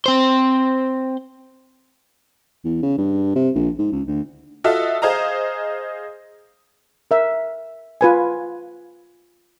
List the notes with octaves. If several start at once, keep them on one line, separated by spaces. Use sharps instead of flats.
C4 C5
E2
C#3
G2
C3
A#1
G#2
C#2
D2
F4 F#4 A4 D#5 E5
G#4 C5 D#5 F5 A#5
A#4 E5
F4 B4 G#5